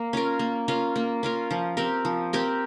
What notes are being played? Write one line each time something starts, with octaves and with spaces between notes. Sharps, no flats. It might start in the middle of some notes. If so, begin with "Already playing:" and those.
Already playing: A#3
C#4 F4 A#4
A#3
C#4 F4 A#4
A#3
C#4 F4 A#4
F3
C4 G4 A#4
F3
C4 G4 A#4